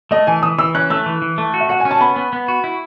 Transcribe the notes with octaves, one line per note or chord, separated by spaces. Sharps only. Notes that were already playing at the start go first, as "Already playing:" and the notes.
A3 D#5
E3 G#5
E3 D#6
E3 E6
C#4 F#6
A3 E6
E3
E3
A3
F#4
E5
F#4 F#5
G#5
C#4
A5
B3 B5
B3
B3
F#4
E4